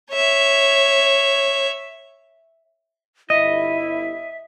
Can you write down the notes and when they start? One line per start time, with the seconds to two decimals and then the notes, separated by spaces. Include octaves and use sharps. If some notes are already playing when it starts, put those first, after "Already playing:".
0.12 C#5 E5
3.30 G1 E4 D#5 E5